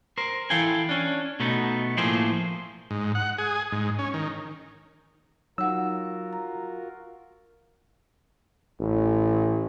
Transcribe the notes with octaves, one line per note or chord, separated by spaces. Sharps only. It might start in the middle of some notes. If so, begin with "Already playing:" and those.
A#4 C5
E3 E4 A4 F5 G5 G#5
C#4 D4
B2 A3 B3 D#4
A2 F3 A3 A#3 G#4 C5
G#2
F#5
G#4
G#2
C#4
D#3
F#3 D#4 F4 F#4 A#4 F#5 E6
A#5
A1